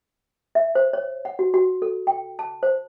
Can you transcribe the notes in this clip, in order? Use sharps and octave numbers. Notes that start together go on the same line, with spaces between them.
E5
C5
C#5
F#5
F#4
F#4
A4
G5
A5
C5